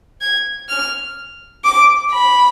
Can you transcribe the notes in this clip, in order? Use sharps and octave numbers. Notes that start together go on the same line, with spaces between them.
G#6
F6
D6
B5